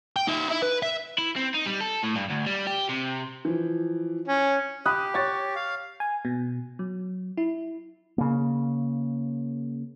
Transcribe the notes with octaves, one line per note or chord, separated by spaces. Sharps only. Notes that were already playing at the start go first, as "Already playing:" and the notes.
G5
D#4 E5
E4
B4
E5
E4
C4
D#4
G3
A4
A2
G2
D2
G3
G4
C3
E3 F3
C#4
G4 B5 D#6 F#6
C#5 A6
F5
G#5
B2
F#3
E4
C#3 A#3